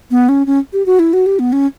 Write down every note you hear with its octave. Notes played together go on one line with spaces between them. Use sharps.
B3
C#4
C#4
G4
F#4
E4
F#4
G4
B3
C#4